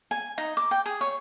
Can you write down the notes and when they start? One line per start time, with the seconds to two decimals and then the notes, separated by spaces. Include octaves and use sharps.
0.11 G#5
0.38 D#4
0.57 D6
0.71 G5
0.86 G#4
1.01 C#5